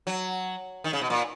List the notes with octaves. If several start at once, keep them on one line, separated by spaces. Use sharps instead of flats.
F#3
D#3
C#3
B2
A#2